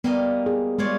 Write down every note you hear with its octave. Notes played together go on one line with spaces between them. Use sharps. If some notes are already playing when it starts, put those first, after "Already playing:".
G3 A#3 B3 D#5
G#4
G3 G#3 F4 C#5 D5